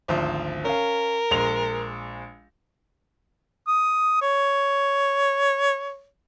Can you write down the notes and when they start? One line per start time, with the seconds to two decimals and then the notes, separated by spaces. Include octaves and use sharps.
0.08 G#1 D2 F3
0.65 C#4 A#4 F5
1.31 A#1 G#3 F7
3.67 D#6
4.21 C#5